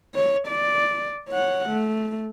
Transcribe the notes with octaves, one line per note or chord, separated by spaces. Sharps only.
C#5
D5
C#5 F#5
A3